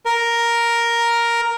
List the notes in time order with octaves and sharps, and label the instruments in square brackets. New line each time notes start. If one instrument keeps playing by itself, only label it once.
[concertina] A#4